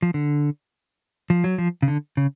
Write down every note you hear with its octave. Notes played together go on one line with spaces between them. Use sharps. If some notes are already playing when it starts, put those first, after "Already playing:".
F3
D3
F3
F#3
F3
C#3
D3
C#3